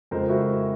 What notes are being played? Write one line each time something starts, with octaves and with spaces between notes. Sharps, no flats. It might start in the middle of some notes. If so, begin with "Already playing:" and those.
F2 C#3 F3 G#3 A#4 C5
E4 F#4